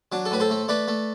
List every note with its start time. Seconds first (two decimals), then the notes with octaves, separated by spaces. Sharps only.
0.12 F#3 D4
0.25 A4
0.31 A2 B4
0.40 A4 C5
0.50 A3
0.68 A3 B4 D5
0.88 A3